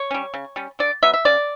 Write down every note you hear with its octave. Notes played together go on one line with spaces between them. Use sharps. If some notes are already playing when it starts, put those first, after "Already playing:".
Already playing: C#5
G3 C#4
C#3
G3 C#4
D3 D5
F#3 B3 E5
E5
C#3 D5